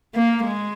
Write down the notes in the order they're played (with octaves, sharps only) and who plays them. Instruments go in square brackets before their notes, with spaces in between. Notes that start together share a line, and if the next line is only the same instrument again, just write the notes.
[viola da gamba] A#3
G#3